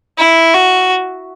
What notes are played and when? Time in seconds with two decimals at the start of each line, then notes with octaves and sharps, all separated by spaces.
0.18 E4
0.54 F#4